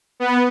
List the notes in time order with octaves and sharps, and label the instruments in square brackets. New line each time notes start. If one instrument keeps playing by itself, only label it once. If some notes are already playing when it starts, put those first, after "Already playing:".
[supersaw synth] B3